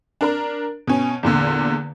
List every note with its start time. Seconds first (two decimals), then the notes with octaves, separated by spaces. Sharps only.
0.21 D4 A#4 A#5
0.87 B2 C#4
1.23 E2 A#2 D3